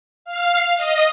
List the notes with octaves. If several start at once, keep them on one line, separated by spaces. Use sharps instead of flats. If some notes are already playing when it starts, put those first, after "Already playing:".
F5
D#5